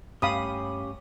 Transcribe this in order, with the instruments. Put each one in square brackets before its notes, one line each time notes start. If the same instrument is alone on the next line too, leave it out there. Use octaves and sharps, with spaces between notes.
[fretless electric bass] G2 A3 [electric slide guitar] C#4 G4 [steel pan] F5 B5 D#6